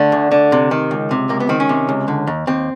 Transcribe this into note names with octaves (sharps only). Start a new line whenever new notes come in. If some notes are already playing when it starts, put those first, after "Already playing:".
Already playing: D3 A3
D2
D3
C3
D#3
C#2
C3
C#2 A#3
B3
D#3 C4
C#4
C3
C#2
D3
D#2
D#2 C4